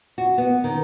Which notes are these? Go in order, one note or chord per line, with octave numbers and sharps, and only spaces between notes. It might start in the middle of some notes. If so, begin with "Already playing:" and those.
F#4
B3
D#3